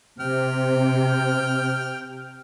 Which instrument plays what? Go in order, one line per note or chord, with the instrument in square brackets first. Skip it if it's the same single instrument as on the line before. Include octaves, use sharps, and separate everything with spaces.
[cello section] C3 [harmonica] G5 F6